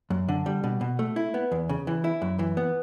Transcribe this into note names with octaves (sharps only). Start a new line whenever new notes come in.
F#2
D3
G3
B2
B2
A3
E4
B3
E2
C#3
E3
E4
F#2
E3
B3